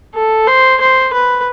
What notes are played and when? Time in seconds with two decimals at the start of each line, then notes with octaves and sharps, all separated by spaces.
0.15 A4
0.47 C5
0.81 C5
1.13 B4